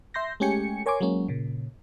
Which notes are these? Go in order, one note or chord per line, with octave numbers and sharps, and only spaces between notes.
E5 C6 G6 A#6
G#3 A3 C#4 G4 G#5 C#7
A#4 C#5 G#5 C6 D6
F#3 G#3 A#3 C#4
A#2 C#3